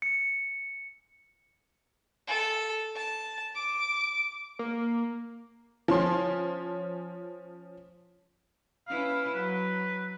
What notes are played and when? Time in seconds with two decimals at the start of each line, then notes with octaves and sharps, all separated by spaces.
0.02 C#7
2.27 A4
2.96 A5
3.55 D6
4.59 A#3
5.88 F3 C#4 C6
8.88 C#4 E4 B4 F5
9.35 F#3 B4